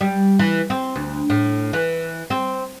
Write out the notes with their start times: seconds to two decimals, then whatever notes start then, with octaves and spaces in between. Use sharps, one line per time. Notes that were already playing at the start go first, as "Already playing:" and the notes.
0.01 G3
0.39 E3
0.70 C4
0.96 D2
1.30 A2
1.73 E3
2.30 C4